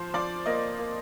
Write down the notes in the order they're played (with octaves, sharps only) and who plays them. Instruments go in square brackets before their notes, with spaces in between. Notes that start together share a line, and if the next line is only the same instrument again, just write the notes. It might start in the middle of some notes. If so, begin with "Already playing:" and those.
Already playing: [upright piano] F3 C5
F3 D5
A#3 D#5
A#3